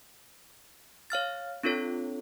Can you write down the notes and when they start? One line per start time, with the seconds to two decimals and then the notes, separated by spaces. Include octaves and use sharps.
1.10 C#5 F5 F6 A6
1.63 C4 D4 F4 A4 C#5